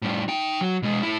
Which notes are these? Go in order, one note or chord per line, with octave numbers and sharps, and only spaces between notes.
A2 G3
D#4 G5
F#3
B2 G#3
A2 E4